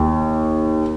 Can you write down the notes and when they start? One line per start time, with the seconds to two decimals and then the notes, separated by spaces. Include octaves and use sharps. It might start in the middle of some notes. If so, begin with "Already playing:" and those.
Already playing: D#2